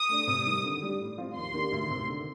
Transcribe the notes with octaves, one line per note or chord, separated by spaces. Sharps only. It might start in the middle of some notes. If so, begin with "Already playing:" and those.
Already playing: D#6
A3 D4
C3
D#3 G3
D3
G3 D4 G4
A2
F3 C4 F4
D#2 C6
D#3 A#3 D4 G4
D2
C3 D#3
D3